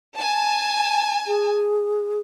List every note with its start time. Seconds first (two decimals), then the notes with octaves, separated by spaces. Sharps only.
0.14 G#5 A5
1.27 G#4